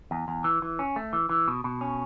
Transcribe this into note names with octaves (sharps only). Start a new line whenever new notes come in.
E2
E2
E3
E3
C#4
A3
E3
E3
B2
B2
C#4